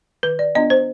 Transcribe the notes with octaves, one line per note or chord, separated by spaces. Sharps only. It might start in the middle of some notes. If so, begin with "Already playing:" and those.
D#3 B4
D5
B3 D4 F4 D#5
C5